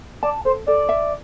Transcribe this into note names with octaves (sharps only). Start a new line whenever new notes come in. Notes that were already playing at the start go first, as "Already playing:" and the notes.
D5 A5
A4 C5
A4 D5
E5